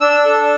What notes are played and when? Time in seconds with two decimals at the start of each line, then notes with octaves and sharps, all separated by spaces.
0.01 D4 E6
0.25 A4